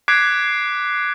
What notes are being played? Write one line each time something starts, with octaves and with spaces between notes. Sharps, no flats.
D6 F#6 G#6 B6 C7 D7